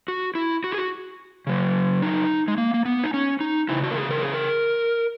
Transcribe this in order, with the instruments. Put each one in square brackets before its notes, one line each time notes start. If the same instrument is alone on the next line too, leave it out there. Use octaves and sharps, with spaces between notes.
[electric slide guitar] F#4
E4
F#4
G#4
F#4
C#3 F#3
D#4
G#3
A#3
A#3
B3
D#4
C#4
D#4
C#3 E3 E4
F#4
A#4
G#4
A#4
G#4
A#4